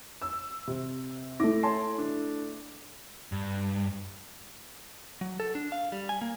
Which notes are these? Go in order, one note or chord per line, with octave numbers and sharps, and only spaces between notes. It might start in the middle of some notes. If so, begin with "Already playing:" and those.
E6
C3
A3 E4 D6 A#6
C#5 A5 C6
D4
G2
F#3
A4
D4
F5
G3
G#5
A#3